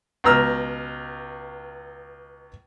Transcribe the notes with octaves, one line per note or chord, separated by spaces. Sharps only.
C#2 B2 A#5 E6 F6